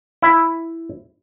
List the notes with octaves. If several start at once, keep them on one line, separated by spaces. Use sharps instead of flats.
E4